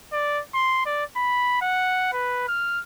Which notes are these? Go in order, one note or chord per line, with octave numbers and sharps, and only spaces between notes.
D5
C6
D5
B5
F#5
B4
F6